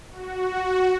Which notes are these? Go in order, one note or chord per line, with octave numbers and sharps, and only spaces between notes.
F#4